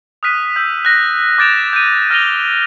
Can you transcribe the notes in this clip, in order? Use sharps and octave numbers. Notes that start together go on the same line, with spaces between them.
D#6 F6 F#6 B6 D#7
E6 F#6 G6
F#6 A#6
D6 G6 A6 D7 E7 F7
G6 B6 D#7
F6 A6 A#6 D#7 F7 G7